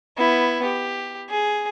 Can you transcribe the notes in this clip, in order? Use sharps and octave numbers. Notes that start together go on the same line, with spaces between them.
B3 E4
G4
G#4